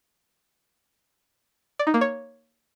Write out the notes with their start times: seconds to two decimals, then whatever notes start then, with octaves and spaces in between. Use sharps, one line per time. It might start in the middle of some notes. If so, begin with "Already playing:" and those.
1.79 D5
1.87 D#4
1.94 A#3
2.01 C#5